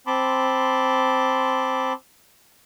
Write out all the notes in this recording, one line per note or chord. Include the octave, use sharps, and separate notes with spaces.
C4 A5 B5 C6 D6